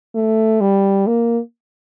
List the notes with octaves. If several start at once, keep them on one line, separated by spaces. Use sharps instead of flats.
A3
G3
A#3